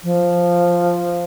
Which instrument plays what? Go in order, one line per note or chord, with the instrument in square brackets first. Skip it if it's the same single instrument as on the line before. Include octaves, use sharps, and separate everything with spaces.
[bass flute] F3